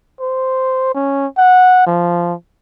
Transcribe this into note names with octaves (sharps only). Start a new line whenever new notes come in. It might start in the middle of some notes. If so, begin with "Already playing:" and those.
C5
C#4
F#5
F3